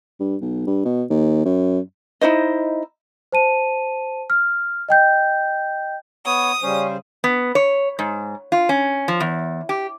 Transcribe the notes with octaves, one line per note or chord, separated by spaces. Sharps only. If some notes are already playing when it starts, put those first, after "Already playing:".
G2
B1
G2
B2
D#2
F#2
D#4 E4 C5 D#5
C5 A5 D#7
F6
D#5 G5 G6
B3 C#5 D#6
C#3 G3 C#4 C5
B3
C#5
G#2
F4
C#4
F3
E2
G4